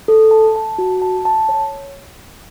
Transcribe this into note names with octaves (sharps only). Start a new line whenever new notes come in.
A4
A5
A5
F#4
A5
A5
C#5